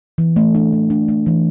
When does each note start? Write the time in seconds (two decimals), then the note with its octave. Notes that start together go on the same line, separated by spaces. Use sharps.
0.18 E3
0.36 A3
0.55 D4
0.72 E3
0.90 D4
1.09 A3
1.26 E3